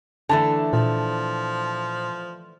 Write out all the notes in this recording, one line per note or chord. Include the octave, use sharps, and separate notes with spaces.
D3 E3 A3 A5
A#2 F3